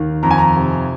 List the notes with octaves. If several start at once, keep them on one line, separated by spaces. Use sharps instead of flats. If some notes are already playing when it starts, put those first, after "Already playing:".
Already playing: D#2 D#3
F2 A#5
G#5
A#5
C3